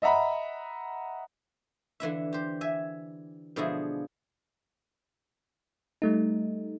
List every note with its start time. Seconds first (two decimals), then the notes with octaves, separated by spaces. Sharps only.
0.02 D#5 E5 F#5 A#5 B5
2.00 D3 E3 E4 E5
2.33 G4 C5
2.61 E5 G#5
3.56 B2 D3 F3 G#3 E4 G#4
6.02 G3 A3 D#4